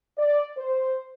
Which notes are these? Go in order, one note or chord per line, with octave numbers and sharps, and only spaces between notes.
D5
C5